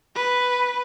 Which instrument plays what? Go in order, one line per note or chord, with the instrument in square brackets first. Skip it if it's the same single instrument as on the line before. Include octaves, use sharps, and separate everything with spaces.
[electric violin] B4